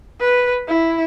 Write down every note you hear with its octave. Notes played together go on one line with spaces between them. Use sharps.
B4
E4